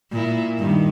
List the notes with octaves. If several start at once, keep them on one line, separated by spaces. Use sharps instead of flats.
A#2 E4
G2 D#3